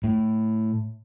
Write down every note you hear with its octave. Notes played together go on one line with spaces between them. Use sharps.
A2